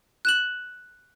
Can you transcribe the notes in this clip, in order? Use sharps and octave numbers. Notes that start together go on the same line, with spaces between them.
F#6 E7 F#7